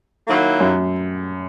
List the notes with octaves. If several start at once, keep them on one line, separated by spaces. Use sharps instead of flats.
D#3 F#3 A#3 E4
F#2